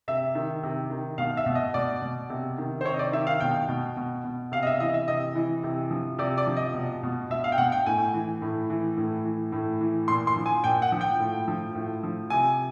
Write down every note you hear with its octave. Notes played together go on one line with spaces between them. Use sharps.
C3 E5
D#3
C3
D#3
B2 F5
E5
B2
D#5
B2 D5
B2
C3
D#3
C5
C3 C#5
D#5
D5
D#3 E5
F5
B2 G5
B2
B2
B2
C3 F5
D#5
E5
E3 D#5
E5
C3 D#5
E3
C3
F3
C3 D5
D5
F3
D#5
B2
B2
B2 E5
F5
G5
B2 F#5
G5
A2 G#5
E3
A2
E3
A2
E3
A2
E3
A#2 C6
C6
F3
G#5
A#2 G5
F#5
F3
G5
A2
F3
A2
F3
C3 G#5